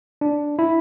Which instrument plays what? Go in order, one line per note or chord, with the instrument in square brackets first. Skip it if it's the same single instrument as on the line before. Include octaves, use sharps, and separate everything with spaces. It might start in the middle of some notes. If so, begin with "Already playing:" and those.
[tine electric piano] D4
E4